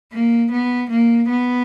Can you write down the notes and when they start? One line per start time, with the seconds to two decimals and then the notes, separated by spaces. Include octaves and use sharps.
0.12 A#3
0.51 B3
0.90 A#3
1.28 B3